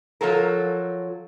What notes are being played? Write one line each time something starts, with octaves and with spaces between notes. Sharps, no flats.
F3 F#3 A4 A#4